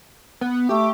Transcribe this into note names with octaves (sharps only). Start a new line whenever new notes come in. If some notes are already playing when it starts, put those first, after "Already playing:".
B3
A3 G4